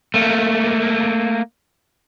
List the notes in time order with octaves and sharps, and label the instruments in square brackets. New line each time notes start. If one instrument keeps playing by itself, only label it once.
[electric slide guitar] A3 A#3